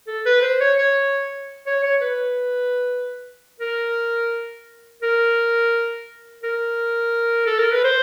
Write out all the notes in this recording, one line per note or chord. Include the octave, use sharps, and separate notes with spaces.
A4
B4
C5
C#5
C#5
C#5
C#5
B4
A#4
A#4
A#4
A4
A#4
B4
C5